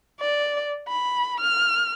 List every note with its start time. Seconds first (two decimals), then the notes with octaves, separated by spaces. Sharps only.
0.20 D5
0.88 B5
1.40 F6